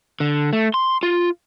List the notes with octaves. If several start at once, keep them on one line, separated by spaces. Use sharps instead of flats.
D3
A3
C6
F4